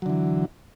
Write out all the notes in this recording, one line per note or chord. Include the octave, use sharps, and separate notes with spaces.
D3 E3 F#3